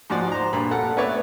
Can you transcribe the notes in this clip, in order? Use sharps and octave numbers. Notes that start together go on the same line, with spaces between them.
G#2 F3 F#4 D5
C5 A#5
G2 A#2 B5
A4 A#4 F#5
A3 B3 B4 C#5 D5 E5